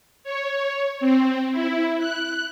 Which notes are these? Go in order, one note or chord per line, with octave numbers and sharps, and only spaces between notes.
C#5
C4
E4
F#6